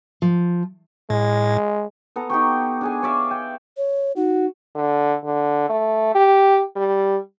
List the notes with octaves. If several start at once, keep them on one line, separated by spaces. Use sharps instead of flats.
F3
A2 G#3
B3 A4 A#5
D#4 G4 G5 C#6
D4 G#4 G#5
C#5 D5 E5 F5
G5
C#5
D#4 F#4
D3
D3
A3
G4
G3